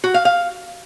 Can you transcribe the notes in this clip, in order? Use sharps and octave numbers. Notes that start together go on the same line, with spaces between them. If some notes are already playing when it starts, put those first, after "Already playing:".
F#4
F5
F5